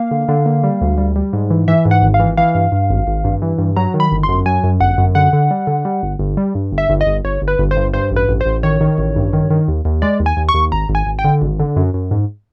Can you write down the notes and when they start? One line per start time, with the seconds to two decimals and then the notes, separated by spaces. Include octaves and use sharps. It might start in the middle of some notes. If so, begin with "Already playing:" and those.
Already playing: A#3 F5
0.11 D3
0.28 D3
0.46 A#3
0.64 G3
0.81 D2
0.98 G3
1.16 G3
1.33 G#2
1.50 E3
1.68 E3 E5
1.85 G#2
1.91 F#5
2.02 G#1
2.14 F5
2.20 E3
2.37 E3 F5
2.55 G2
2.72 G2
2.90 G#1
3.07 G#1
3.24 G2
3.42 E3
3.59 G2
3.77 F#3 A#5
3.94 D#3
4.00 B5
4.12 G1
4.23 C6
4.29 F#2
4.46 F#3 G#5
4.64 F#2
4.80 G1 F#5
4.98 F#2
5.15 D3 F#5
5.33 D3
5.51 G3
5.67 D3
5.85 G3
6.03 G1
6.19 G1
6.37 G3
6.55 G2
6.72 G1
6.78 E5
6.89 G1
7.01 D#5
7.07 G1
7.25 G1 C#5
7.42 G1
7.48 B4
7.59 G1
7.71 C5
7.76 G2
7.94 G2 C5
8.11 A1
8.16 B4
8.29 A1
8.41 A1 C5
8.63 D#3 C#5
8.81 D#3
8.98 A1
9.16 G2
9.33 D#3
9.50 D#3
9.68 D#2
9.85 D#2
10.02 G#3 D5
10.20 D#2
10.26 G#5
10.37 D#2
10.49 C#6
10.54 D#2
10.72 G#1 A#5
10.89 G#1
10.95 G#5
11.07 G#1
11.19 G5
11.24 D3
11.42 G#1
11.60 D3
11.76 F#2
11.94 F#2
12.11 G#2